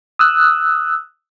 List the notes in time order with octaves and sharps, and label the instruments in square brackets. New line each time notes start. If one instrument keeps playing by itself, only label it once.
[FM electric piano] D#6 E6 F#6